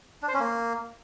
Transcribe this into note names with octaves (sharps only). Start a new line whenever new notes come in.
D4
C5
C#4
A#3